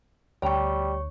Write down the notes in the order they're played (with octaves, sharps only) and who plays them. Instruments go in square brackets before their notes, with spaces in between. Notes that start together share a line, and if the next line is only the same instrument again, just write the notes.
[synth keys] D2 [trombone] G3 [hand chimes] C#5 C#6 [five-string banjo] G5 A#5